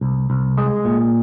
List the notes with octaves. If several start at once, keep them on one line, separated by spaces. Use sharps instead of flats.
C2
C2
G#3
A#2